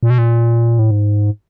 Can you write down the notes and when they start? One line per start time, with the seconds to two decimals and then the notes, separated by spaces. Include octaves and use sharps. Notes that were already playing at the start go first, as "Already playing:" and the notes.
0.03 A#2
0.10 B2
0.18 A#2
0.79 A2
0.91 G#2